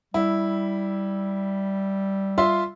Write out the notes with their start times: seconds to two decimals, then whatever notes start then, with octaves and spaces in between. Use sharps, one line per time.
0.14 G3 E4
2.38 F4 E5 C6